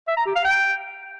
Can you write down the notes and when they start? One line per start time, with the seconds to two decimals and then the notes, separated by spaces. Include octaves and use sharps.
0.08 E5
0.17 A#5
0.26 G4
0.35 F5
0.45 G5